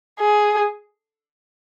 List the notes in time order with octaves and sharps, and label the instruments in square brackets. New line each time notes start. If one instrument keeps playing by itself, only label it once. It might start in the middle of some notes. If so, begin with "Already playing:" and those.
[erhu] G#4